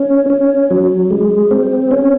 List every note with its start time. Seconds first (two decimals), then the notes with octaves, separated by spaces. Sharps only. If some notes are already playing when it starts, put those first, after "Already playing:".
Already playing: C#4
0.30 C#4
0.70 F#3
1.11 G#3
1.51 C4
1.91 C#4